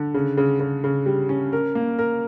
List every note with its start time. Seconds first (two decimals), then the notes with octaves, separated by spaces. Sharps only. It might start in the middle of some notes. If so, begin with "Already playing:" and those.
Already playing: D3
0.14 C#3
0.37 C#3
0.60 C#3
0.84 C#3
1.06 G3
1.29 C#4
1.53 A#4
1.75 A#3
1.99 A#4